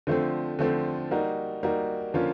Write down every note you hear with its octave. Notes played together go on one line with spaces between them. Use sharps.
D3 F3 A3 C4
D3 F3 A3 C4
G3 A#3 D#4 F#4
G3 A#3 D#4 F#4
D3 F3 A#3 C#4 F4